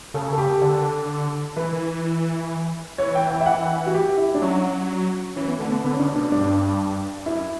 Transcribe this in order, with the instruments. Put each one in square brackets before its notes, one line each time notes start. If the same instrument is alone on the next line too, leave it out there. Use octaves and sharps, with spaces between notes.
[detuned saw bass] C#3 [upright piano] A4
[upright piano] A4
G4
[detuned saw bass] D3 [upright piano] A4
[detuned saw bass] E3 [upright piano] B4
[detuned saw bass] E3 [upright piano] C#5
[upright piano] G5
G5
E5
F#5
F#4
G4
E4
D4
[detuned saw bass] F#3 [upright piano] C#4
[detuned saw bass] E3 [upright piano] C#4
[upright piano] B3
[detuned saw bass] D3 [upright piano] A3
[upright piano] B3
[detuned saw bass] D3 [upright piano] B3
[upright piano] C#4
[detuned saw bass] C#3 [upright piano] D4
[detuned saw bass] B2 [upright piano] D4
[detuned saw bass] G2 [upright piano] D4
[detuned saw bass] F#2 [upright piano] E4